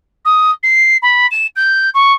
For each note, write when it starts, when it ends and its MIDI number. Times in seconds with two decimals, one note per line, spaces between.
0.25 0.51 87
0.63 0.97 96
1.02 1.27 83
1.31 1.47 100
1.56 1.90 91
1.94 2.13 85